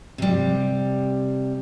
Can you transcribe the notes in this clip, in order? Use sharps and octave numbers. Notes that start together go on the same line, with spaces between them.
C3 G3